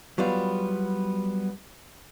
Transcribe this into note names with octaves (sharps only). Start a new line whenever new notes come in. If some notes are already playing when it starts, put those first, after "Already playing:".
F#3 G3 B3 F4